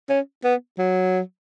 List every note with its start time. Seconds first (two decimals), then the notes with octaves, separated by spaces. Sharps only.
0.09 C#4
0.44 B3
0.78 F#3